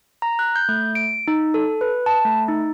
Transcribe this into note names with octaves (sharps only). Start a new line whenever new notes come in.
A#5
F#6
G6
A3
D7
D#4
A4
B4
A5
A3
D#4